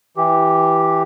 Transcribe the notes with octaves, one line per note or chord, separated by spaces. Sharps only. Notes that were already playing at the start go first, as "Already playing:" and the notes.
E3 G4